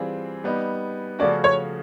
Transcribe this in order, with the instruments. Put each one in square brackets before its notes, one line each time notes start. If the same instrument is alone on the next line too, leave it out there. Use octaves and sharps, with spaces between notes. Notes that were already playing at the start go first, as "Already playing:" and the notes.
Already playing: [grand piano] E3 G3 C4 F4 G#4
G3 B3 D#4
[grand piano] C#3 F3 A3 C#4 F#4 [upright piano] D5
[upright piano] C#5